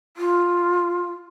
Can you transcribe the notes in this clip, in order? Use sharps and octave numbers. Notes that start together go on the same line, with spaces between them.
F4